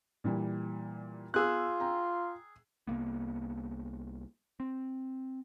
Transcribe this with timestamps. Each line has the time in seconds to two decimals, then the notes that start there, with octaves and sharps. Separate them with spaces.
0.24 A#2 E3 G3
1.34 B3 F4 G#4 E6 F#6
1.80 G5 A#5
2.87 C2 A#3 B3
4.60 C4